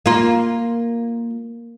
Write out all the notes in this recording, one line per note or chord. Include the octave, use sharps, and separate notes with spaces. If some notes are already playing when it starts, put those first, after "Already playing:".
A#3 F4